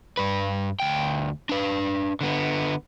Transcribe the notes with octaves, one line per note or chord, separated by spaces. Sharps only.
G2 B4
D2 G5
D4 B4
D3 B3